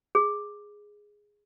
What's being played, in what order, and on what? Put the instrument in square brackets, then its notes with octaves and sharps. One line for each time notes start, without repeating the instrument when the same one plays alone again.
[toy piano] G#4